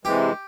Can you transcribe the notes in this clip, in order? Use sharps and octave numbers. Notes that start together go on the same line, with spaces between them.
C3 E3 G#3 G4